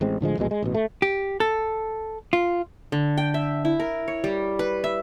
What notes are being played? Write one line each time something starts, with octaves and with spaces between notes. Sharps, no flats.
A1 G#3 C4
A2 D3 F3 G#3
A#1 E2 B2 G#3
G#3
A1 B2
A3
G4
A4
F4
D3
G5
E5
E4
A#4
C#5
G3
B4
E5